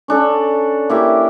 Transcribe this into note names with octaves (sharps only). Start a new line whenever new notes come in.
C#4 D4 A4
A#3 E4 G4